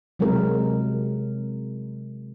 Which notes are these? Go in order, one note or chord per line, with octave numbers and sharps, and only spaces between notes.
C3 F#3 G#3 C4 A#4